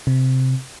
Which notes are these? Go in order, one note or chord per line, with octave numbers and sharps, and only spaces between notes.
C3